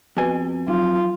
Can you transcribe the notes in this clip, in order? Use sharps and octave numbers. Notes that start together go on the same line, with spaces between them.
F2 B3 F#4 B4 G#5
F#3 F4